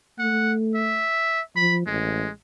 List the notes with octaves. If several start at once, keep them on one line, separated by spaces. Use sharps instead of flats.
A3 F#5
E5
F3 B5
A1 G#3